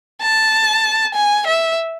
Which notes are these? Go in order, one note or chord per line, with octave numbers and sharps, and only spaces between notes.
A5
G#5
E5